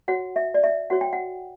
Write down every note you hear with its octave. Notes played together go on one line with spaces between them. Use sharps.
F#4 C#5 F#5
E5
D5
E5
F#4 C#5 F#5
G5
F#5